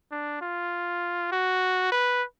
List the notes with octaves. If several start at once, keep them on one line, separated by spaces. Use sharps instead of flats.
D4
F4
F#4
B4